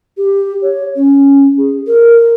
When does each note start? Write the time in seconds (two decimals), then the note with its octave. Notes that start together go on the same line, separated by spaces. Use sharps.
0.17 G4
0.62 C#5
0.96 C#4
1.58 G#4
1.87 A#4